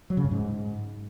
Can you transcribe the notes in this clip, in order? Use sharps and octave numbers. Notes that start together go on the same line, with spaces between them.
F#3
C#3
G2
G#2